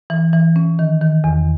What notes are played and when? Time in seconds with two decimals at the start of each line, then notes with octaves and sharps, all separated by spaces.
0.10 E3
0.33 E3
0.56 C#4
0.79 D#3
1.02 D#3
1.24 E2